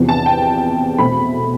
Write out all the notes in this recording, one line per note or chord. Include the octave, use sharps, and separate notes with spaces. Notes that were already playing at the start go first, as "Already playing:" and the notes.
Already playing: E2 C3 F3 B3
A5
G5
E2 B2 A3 C4 B5